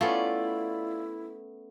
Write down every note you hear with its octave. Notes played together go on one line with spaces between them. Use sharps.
A3 B3 C#4 E4 F4 D5